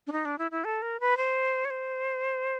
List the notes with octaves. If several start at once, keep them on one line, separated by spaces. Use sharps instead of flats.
D4
D#4
D4
E4
E4
A4
A#4
B4
C5
C#5
C5